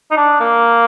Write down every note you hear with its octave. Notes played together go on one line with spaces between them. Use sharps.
D#4
D4
A#3